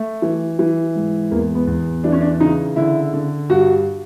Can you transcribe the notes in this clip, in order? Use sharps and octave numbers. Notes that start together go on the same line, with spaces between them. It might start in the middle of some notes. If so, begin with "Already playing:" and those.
Already playing: A3
E3
E3
G#2
E2 A#3
B3
E2
E3 D4
C#4
D4
C#3 D#4
D3 E4
D3
G2 F#4